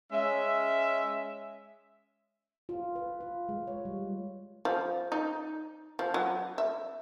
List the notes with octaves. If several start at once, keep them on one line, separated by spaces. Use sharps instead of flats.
G#3 C#4 E5
F4
B4
F4
G#3
C#5
G3
F3
D#4
F3
F#3
E5